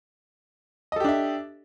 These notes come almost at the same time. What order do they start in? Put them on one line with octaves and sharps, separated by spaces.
D#5 A4 G4 D4 E5